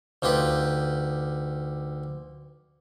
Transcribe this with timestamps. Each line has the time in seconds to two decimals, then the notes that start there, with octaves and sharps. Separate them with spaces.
0.22 D2 D#4 F4 G4 B4